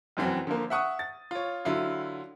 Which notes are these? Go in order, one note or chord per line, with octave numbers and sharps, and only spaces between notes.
F1 F#2 E3 C4 F#4
D3 F3 A#3
E5 F#5 C#6 D#6
A6
F4 C#5
D3 F#3 E4 F4